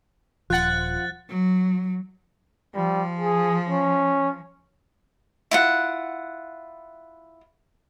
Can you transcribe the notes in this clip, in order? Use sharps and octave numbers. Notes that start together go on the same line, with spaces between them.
D#1 F3 F4 F#5 F#6 A6
F#3
F3 G3
G#4
C#4
E4 F4 F#5